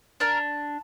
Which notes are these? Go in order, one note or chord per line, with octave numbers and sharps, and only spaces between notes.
D4 A#4